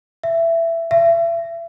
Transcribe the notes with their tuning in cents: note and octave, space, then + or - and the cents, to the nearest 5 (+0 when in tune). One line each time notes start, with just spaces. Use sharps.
E5 +15
E5 +35